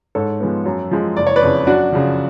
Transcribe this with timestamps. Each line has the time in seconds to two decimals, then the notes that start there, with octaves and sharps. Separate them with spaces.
0.15 G#2 A4 C#5
0.40 F3 G#3 B3
0.66 F#2
0.91 F3 G#3
1.17 F#1 D5
1.27 C#5
1.36 B4 D5
1.42 F2 C#3
1.67 F#2 D4 F#4
1.92 C#3 F3